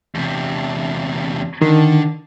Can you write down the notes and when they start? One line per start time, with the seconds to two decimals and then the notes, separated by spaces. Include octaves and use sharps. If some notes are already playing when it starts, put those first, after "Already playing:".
0.15 E2 C3
1.62 D3 D#3